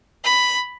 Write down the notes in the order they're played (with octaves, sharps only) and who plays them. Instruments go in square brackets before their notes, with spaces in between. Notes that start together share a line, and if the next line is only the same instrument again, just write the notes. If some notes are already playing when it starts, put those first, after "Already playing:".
[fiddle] B5